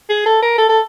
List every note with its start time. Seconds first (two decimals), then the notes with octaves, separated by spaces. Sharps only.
0.10 G#4
0.26 A4
0.42 A#4
0.58 A4
0.69 A4